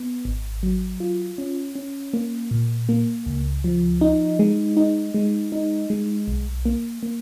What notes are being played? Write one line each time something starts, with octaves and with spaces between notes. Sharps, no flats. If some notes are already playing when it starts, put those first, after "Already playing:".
Already playing: B3
G#1
F#3
F4
C#4
C#4
A#3
A#2
A#3
C#2
F3
D#4
G#3
D#4
G#3
D#4
G#3
B1
A#3
A#3